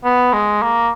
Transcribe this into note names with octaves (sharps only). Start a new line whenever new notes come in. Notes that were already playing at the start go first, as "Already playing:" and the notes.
B3
G#3
A#3